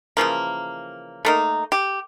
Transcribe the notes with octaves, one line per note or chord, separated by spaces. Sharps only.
C#3 E3 F3 A#3
A3 A#3 D#4
G4